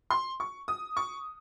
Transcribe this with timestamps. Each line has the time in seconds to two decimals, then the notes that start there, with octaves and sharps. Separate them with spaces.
0.10 C6
0.40 C#6
0.68 D#6
0.97 C#6